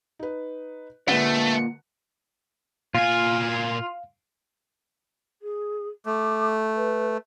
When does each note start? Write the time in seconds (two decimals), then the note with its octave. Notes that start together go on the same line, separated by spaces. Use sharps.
0.19 D#4 B4
1.08 A#2 D3 G#3 A3 B4 F#5
2.95 A#2 F4 F5 G#5
5.42 G#4
6.06 A3 D6
6.76 B4